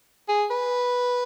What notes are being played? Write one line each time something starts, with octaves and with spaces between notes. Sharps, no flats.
G#4
B4